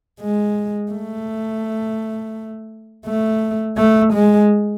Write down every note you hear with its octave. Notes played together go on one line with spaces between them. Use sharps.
G#3
A3
A3
A3
G#3